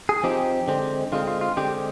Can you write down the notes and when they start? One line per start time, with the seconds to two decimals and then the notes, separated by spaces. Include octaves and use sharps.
0.09 G#4
0.23 F3 C4 D#4 G4
0.68 D3 G#3 C4
1.12 D3 G#3 C4 F4
1.27 F4
1.41 F4
1.57 D3 G#3 C4 G4